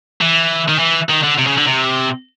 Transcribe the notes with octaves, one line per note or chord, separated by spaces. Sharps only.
E3
D#3
E3
D#3
D3
C3
C#3
D3
C3